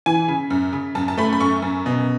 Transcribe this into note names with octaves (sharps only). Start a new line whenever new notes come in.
E3 G#5
C#3
F#2
C#3
F#2 A5
A5
A3 B5
B5
F#2 C#6
F#2
B2